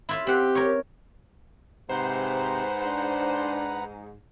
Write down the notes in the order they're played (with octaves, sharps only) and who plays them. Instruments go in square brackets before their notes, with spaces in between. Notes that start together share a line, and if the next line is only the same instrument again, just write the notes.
[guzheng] E4 F4 E5
[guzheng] C4 F#5 [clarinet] G4
[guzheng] A#4 C#5
[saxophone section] G#2 [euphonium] C3 [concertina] B4 F#5 A#5 [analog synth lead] C5
[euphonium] D4